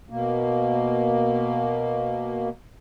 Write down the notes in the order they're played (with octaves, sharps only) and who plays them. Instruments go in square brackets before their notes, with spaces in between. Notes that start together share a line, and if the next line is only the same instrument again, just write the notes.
[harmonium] B2 A#3